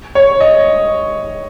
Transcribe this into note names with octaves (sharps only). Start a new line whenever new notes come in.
C#5
D#5